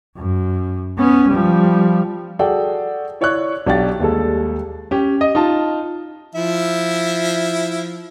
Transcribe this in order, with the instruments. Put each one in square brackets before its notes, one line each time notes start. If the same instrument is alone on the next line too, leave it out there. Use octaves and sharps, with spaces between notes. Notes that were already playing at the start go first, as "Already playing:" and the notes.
[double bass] F#2
B3 C#4
F3 G3
[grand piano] F#4 G#4 A4 D5 G5
E4 C#5 D5 C#6 F#6
B1 D4 F#4 G4 F#5 A6
D#2 G3 G#3 A4
C#4 G4
D#5
D#4 F4 A5
[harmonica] F3 E4 E5